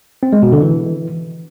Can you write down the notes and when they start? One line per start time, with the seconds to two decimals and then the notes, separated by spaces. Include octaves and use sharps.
0.23 C4
0.33 G#3
0.43 B2
0.52 D3
0.62 E3